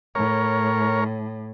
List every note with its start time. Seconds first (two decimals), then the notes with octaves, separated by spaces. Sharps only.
0.15 A2 A#4 C#5